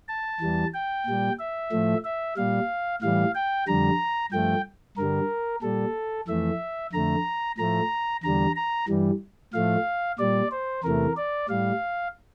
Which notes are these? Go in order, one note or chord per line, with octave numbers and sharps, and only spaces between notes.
A5
E2 E3 G3
G5
A#2 G3
E5
A2 F3 A3
E5
A#2 G3 F5
A2 E3 G3 F5
G5
F2 D3 G3 A#5
G2 F3 A3 G5
G2 D3 G3 A#4
A#2 G3 A4
F2 E3 A3 E5
F2 D3 A3 A#5
A2 F3 A3 A#5
E2 D3 G3 A#5
A#5
G2 E3 G3
A2 F3 A3 F5
A#2 G3 D5
C5
E2 C3 E3 A3 A#4
D5
A2 G3 F5